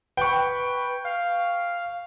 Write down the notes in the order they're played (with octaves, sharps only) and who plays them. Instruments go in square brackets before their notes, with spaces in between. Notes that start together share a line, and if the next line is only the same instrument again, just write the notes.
[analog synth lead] B4 [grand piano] G5 C#6
[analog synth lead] F5